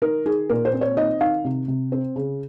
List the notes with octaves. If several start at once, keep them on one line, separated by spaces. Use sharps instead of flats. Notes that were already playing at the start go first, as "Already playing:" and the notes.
D#3 A#4
D#3 G#4
A#2 A#4
C5
C4
C#5
D#3 D#5
D#3 F5
C3
C3
C4
C#3